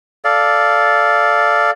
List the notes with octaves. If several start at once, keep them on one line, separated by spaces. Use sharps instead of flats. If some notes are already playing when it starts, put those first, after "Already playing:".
A4 D5 F5